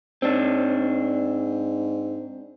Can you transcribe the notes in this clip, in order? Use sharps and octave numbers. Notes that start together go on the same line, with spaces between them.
G#2 C4 D4